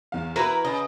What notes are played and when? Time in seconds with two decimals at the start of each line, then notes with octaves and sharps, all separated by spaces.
0.12 E2 F5
0.36 E4 F#4 A#4 B4 A#5
0.65 C#3 D#5